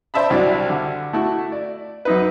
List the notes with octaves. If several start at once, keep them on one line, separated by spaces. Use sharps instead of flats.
C5 D5 E5 A5 B5
C2 F#3 D4 D5
D3
A3 E4 F#4
D5
F#2 D#4 B4